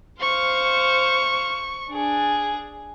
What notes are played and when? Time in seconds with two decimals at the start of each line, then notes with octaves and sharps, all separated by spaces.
0.20 C5 F5 C#6
1.89 D4 G#4